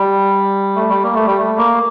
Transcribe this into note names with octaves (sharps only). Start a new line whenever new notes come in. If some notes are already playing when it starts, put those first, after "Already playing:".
Already playing: G3
A3
G3
A#3
A3
G3
A3
A#3